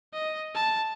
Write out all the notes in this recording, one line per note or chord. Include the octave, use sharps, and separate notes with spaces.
D#5
A5